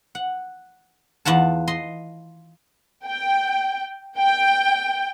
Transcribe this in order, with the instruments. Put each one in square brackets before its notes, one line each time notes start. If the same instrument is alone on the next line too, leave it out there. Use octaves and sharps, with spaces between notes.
[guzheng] F#5
E2 F4 F#5 A5
D#5 C6
[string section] G5
G5